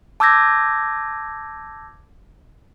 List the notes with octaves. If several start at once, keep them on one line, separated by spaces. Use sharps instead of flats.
A5 D6 E6 G6 G#6 A#6